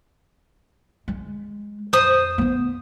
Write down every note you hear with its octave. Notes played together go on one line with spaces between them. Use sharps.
G#3
F2 C5 D#6
A#3 B3